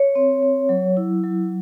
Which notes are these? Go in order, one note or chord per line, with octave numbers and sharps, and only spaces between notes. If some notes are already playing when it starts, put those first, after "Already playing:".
Already playing: C#5
C4
C4
F#3
E4
F#3